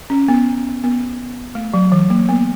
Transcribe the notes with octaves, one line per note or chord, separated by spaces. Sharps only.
C#4
B3
B3
A3
F#3
E3
A#3
B3